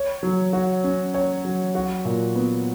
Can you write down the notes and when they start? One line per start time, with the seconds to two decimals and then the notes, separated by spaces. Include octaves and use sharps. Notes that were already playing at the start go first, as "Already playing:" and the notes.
Already playing: C#5
0.23 F#3
0.53 F#4
0.84 C#4
1.14 C#5
1.45 F#3
1.75 F#4
2.05 A#2
2.35 B3